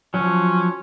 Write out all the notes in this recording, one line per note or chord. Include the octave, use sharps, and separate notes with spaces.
F3 F#3 C#4